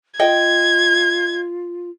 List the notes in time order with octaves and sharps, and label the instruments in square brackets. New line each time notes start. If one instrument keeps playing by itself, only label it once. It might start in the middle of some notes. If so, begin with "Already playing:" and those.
[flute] F4 [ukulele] D#5 G5 [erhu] G#6